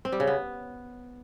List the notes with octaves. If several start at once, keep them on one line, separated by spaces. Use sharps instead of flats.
C4
G3
C#3
B3